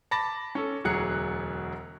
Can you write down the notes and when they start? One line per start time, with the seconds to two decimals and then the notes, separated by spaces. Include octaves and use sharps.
0.11 A5 B5 D6 A6 A#6
0.55 C#4 A4
0.84 E1 D2 F#3 G#4 F#6 C#7